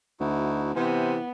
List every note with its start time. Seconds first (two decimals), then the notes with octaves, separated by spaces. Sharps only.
0.20 D2 D#4 E4 F#4
0.75 C3 E3 B3 C5 G#5